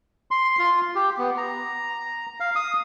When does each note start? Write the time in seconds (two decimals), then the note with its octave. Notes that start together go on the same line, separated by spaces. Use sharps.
0.31 C6
0.59 F4
0.95 G4
1.18 B3
1.38 A#5
2.40 F5
2.56 D#6